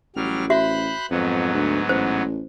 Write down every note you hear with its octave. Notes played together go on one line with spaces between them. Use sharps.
A1 F#3 G3 F6
F#4 C5 E5 B5 F#6
F2 G#2 F#3 B3
D2
A1 C5